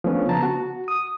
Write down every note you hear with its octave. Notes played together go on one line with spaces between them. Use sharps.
F3 A3 B3 C#4 D4
C#3 B3 A5 A#5
F#4
D#6